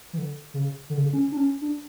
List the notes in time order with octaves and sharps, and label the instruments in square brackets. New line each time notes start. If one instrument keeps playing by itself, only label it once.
[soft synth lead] E3
D3
C#3
D3
C#3
D3
C#4
D4
C#4
D4